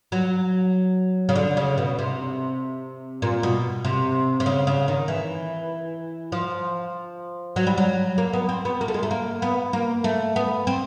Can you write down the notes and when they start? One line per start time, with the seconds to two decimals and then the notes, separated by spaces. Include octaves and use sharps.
0.12 F#3
1.29 C#3
1.35 D3
1.57 C#3
1.78 B2
1.99 C3
3.22 A#2
3.43 B2
3.85 C3
4.40 C3
4.46 C#3
4.67 C#3
4.88 D#3
5.08 E3
6.32 F3
7.56 F#3
7.67 G3
7.77 F#3
8.18 A#3
8.33 B3
8.49 C4
8.65 B3
8.81 A#3
8.88 A3
8.94 G#3
9.03 A3
9.11 A#3
9.42 B3
9.73 A#3
10.04 A3
10.36 B3
10.67 C4